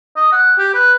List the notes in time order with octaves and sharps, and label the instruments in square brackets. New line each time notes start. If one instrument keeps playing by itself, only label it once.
[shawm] D#5
F#5
G4
B4